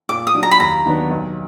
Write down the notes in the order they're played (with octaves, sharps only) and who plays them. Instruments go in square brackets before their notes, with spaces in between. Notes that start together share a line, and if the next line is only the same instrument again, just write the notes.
[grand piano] A#2 [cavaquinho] D6
[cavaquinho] D#6
[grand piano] F#3 D4
[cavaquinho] A#5
B5
[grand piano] D#2 [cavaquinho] A#5
[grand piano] D#3 F#3 B3 D4
B1